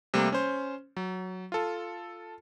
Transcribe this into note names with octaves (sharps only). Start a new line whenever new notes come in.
C3 G3 A3 A#3
C#4 C5
F#3
F4 A4